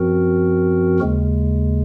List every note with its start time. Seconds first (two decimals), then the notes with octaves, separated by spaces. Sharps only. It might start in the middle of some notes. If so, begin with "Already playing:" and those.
Already playing: F#2 F3 C4 F#4 A#4
1.00 D#2 C#3 G#3